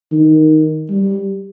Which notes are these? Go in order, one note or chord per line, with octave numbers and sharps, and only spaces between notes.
D#3
G3